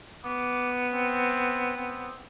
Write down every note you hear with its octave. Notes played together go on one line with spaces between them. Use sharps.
B3 D6
C4
C4